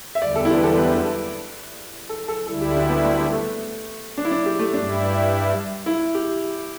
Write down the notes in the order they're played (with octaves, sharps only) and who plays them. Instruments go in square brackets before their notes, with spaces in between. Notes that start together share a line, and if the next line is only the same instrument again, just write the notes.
[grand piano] E5
[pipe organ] E2 D3 G3 [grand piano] D5
[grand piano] A4
E4
G4
B4
A4
B4
A4
A4
[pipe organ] D2 D3 G3 E4 [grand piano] A4
[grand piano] G4
D4
B3
A3
A3
D4
E4
D4
G4
A3
[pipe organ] G2 G3 E4 [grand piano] D4
[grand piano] E4
G4